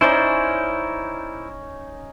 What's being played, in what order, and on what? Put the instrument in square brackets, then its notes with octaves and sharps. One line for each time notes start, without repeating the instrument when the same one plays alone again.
[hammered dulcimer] C#4 D#4 [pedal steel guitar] E4 C5 D5